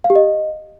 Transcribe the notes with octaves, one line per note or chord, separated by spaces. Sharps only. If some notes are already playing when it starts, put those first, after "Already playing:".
F5
G4
D#5